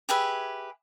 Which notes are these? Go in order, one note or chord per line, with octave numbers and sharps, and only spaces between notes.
G4 G#4 B4 E5